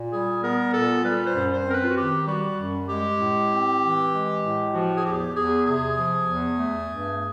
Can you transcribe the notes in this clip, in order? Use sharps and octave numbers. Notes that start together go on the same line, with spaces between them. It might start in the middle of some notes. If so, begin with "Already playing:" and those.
Already playing: A#2
G3 G#4
B3 A#4
A#2 A4
G3 B4
C5
F#2
C5
C4 A#4
B4
F4
F#4
D#3 G4
G3 F#4
F#2
G#3 G4
A2
C4
E3
G#3
A2
F3 F#4
G#4
E2 G4
E2 G#4
C3 G#4
F3
E2
A3
G2